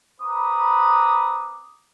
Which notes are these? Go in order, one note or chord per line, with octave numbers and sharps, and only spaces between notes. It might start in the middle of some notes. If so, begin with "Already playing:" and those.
C4 B4 A#5 B5 D6 D#6